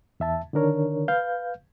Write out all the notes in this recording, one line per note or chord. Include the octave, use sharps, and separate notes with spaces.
E2 E5 A5
D3 D#3 D4 A#4 C#5
B4 F5 G6